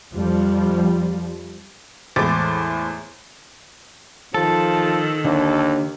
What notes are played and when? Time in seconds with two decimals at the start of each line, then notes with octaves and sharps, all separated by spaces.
0.14 F2 F3 G3
2.16 E2 A2 G#3 C5 D6 A6
4.34 D#3 F3 A4
5.25 D#2 D3